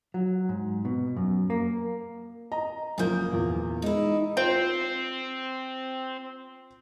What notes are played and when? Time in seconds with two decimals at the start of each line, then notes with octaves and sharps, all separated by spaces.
0.14 F#3
0.49 G#2
0.85 B2
1.17 F#2
1.50 A#3
2.52 D#5 A#5
2.98 F#1 F3 A#3 G#4 G6
3.32 E2 A#2
3.82 G#3 D#4 E4
4.37 C4 F4 C5 G5